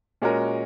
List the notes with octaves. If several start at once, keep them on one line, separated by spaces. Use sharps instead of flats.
A#2 G#3 C#4 F#4 A#4